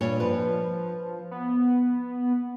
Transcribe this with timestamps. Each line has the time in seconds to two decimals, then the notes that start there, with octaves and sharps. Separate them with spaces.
0.01 G2 A#2 C#5
0.20 F3 B4
1.31 B3